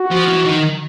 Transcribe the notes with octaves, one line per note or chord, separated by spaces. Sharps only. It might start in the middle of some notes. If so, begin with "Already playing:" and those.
Already playing: F#4
F3
E3
D#3